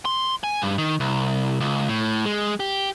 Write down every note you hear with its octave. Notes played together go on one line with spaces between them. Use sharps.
C6
G#5
G2
D#3
C2
C#2
A2
G#3
G4